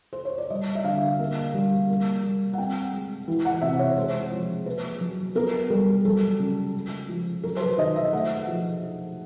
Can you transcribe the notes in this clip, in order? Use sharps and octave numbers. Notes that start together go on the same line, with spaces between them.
C5
C#5
D5
G3 D#5
E5
D3 F5
A#3
G3
A#3
G3
F#5
C4 G5
G#3
E3
F#5
C3 E5
C#5
G#3 C5
F3
A#3 B4
F#3
B3 A#4
G3 A#4
F#3 A4
C#3
G#3
F3
F#3 A#4
C5
B4
D#3 D#5
E5
A3 F#5
F3